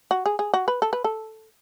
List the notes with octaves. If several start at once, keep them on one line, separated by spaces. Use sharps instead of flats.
F#4
G#4
G#4
F#4
B4
A4
B4
A4